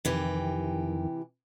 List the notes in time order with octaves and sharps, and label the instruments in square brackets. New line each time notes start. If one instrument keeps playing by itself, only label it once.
[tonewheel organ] F2 D#3 [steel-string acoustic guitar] C3 E3 G4